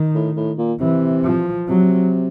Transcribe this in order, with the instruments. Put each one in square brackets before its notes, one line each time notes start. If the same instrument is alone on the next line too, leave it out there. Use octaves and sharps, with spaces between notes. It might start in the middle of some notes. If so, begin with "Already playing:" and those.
Already playing: [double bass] D#3
[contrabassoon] A2
A2
A#2
[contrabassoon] C3 [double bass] E3
[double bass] F3
[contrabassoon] C3 [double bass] F#3